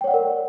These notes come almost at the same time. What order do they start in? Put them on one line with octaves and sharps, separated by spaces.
G5 C#5 F#5 D5 A#4